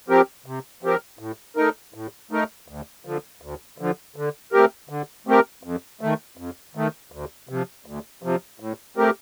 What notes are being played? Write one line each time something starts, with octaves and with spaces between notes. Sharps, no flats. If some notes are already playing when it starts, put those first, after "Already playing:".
F3 C4 G4 A#4
C3
F3 C4 G4 A#4
A2
A3 D#4 A#4
A2
A3 D#4 A#4
D2
D3 F3
D2
D3 F3
D3
A3 C4 G4 A#4
D3
A3 C4 G4 A#4
F2
D#3 A3
F2
D#3 A3
D2
C3 F3
D2
C3 F3
A2
A3 C4 G4 A#4